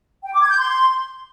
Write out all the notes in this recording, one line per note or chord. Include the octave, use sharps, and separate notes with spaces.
G5
D6
G#6
G6
C6